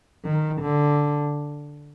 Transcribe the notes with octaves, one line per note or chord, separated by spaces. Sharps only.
D#3
D3